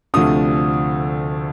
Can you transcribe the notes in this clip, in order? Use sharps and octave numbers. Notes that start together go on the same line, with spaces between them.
D2 C3 F3 A3 D4 D#6